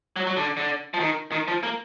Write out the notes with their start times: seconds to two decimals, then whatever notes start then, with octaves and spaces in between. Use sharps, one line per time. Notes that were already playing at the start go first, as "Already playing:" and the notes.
0.16 F#3
0.27 F#3
0.37 D3
0.57 D3
0.94 F3
1.00 D#3
1.32 D#3
1.48 F3
1.63 A#3